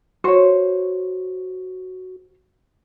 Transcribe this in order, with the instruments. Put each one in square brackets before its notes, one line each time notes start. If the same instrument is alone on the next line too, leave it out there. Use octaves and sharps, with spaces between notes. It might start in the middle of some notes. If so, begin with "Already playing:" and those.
[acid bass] F#4 [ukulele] C5 C#5